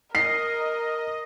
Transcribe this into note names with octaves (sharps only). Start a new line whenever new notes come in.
A#4 D#5 C7